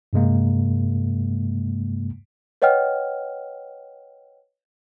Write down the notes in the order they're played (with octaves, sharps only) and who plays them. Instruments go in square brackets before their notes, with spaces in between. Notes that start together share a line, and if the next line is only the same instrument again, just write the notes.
[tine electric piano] G2 C3 G#3 A#3
[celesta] B4 C#5 D#5 F#5 G5 F6